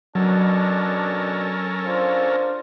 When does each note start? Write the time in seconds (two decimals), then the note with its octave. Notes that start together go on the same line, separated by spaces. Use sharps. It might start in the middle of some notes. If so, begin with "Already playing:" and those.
0.15 B2 F#3 C#4 D4 A4 A#4
1.86 D4 F4 C5